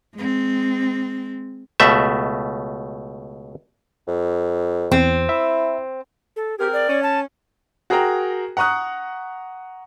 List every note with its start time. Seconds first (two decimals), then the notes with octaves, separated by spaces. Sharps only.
0.15 G#3 C4
1.80 C#2 B2 A3 E5
4.07 F2
4.92 E2 C4
5.29 E4 E5
6.36 A4
6.58 C4 G4 G#4 A#4
6.73 D5
6.87 C#4
7.03 A5
7.90 F#4 G#4 A#4 G5 A#5
8.57 F#5 A#5 C#6 D#6 F#6